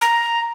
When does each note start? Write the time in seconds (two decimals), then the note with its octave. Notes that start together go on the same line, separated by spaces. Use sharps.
0.01 A#5